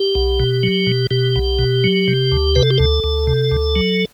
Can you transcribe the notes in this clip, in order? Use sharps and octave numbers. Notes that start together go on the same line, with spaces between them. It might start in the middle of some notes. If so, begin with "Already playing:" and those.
Already playing: G4
B1
B2
F#3
B2
B2 G4
B1
B2
F#3
C3
D2
C3 B4
A4
G4
D2 A4
D2
C3
D2
F#3